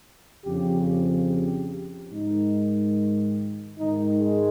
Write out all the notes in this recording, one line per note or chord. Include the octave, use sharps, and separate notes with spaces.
F2 C#3 F3 G4
G4
G#2 D#3 D#4
G#2 D#3 D#4
G#3